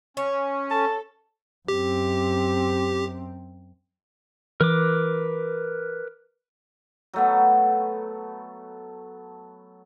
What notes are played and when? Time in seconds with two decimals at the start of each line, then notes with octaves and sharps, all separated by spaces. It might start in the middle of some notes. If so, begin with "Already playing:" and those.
0.17 C#4 C#5
0.70 A4 A5
1.68 F#2 C4 G4
4.61 E3 A#4 B4 D6
7.13 F#3 A3 B3